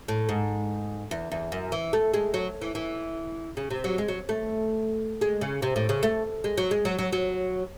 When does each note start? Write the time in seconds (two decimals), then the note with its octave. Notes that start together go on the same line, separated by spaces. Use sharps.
0.08 A2
0.29 G#2
1.11 E2
1.32 E2
1.52 F#2
1.72 E3
1.93 A3
2.14 G#3
2.34 F#3
2.61 E3
2.75 E3
3.57 C#3
3.70 C3
3.84 F#3
3.98 G#3
4.08 F#3
4.29 A3
5.21 G#3
5.41 C#3
5.62 C3
5.76 A2
5.89 C#3
6.03 A3
6.44 G#3
6.57 F#3
6.71 G#3
6.85 F#3
6.99 F#3
7.13 F#3